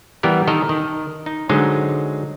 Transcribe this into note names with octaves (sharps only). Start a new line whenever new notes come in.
E3 G3 B3 G4 A#4
D#3 A4 A#4 D#5
D#3
D#4
D3 F#3 G#3 D#4 C5